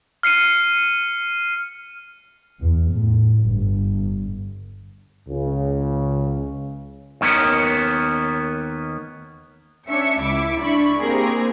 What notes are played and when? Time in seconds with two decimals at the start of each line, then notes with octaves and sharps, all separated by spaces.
0.23 F6 C7 C#7 D#7
2.60 E2
2.92 A2
3.43 G1
5.28 C#2 C#3
7.21 D#2 D#3 A#3 B3 C#4
9.89 C#4 D4 E5 C#7
10.21 C#2 E4 E5 D6
10.60 D4 E4 B5 C#6
10.98 A#3 C4 G4 G#4 A#4